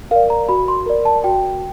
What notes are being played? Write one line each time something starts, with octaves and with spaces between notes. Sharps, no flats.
A#4 D5 F5
A#5
F#4 B5
C6
A#4 D5
A5
F#4 G5